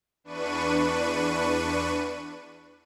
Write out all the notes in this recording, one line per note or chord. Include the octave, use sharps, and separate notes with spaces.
E2 D4 B4 C#6 D#7